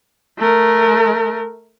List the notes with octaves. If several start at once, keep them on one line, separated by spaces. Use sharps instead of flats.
A3 A#4